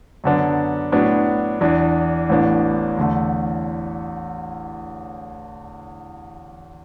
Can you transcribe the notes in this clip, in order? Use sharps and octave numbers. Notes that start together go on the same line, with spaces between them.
F#2 D3 B3 D4
A2 F#3 B3 D4
E2 E3 D4
A1 A2 E3 B3 D4
E2 D3 A3